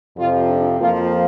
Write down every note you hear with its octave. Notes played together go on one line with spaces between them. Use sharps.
F2 C3 F3 F4
D4
F2 F3 A#3 F4